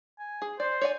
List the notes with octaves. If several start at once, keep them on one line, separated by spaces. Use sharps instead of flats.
G#5
G#4
C5 D5
C#5 D5 G#5